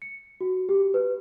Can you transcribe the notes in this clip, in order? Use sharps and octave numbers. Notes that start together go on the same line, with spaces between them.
C#7
F#4
G4
B4